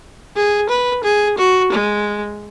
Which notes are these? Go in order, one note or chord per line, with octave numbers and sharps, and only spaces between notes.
G#4
B4
G#4
F#4
G#3